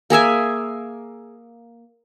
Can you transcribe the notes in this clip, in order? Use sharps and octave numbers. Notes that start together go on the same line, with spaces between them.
A#3 G#4 E5 G#5